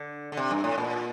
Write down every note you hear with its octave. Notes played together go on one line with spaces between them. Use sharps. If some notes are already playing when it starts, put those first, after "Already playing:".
Already playing: D3
D3
C3
G2
A2
A#2